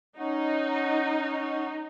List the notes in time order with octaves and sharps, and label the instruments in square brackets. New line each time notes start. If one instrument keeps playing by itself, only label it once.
[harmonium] C#4 C#5 F#5 [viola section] D#4